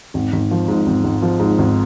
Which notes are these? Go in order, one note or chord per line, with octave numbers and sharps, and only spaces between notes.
G#1
G#1
F3
G#2
G#1
G#1
F3
G#2
G#1